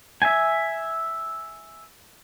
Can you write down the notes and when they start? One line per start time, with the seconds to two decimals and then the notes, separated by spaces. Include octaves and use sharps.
0.22 E5 G#5